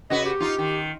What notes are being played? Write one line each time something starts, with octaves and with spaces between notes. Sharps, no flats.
C#3 F#4 B4 D#5
G4
D#4 F4
D#3